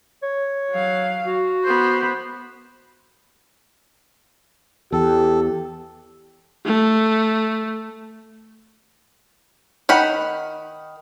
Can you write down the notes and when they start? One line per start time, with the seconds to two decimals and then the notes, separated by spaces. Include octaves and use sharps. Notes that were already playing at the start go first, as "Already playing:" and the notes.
0.23 C#5
0.71 F#3 F5
1.26 F#4
1.64 B3 C5
4.92 E2 G4 A4
6.66 A3
9.89 D#3 F#5 B5